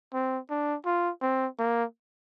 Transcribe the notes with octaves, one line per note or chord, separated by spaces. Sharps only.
C4
D4
F4
C4
A#3